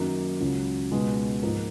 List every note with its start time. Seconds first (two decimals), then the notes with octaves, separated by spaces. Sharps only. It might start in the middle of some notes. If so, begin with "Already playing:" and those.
Already playing: F#2 D#3 F#3 A#3 D#4
0.40 C#2 C#3 F#3
0.92 C#2 B2 G#3
1.43 G#2 F3 A#3 D#4